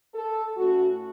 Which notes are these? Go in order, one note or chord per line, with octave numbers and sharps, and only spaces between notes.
A4
A2 A3 C#4 F#4